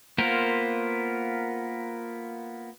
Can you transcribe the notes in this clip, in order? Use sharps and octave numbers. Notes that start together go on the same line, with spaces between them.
A#3 B3 F4 A#4 C5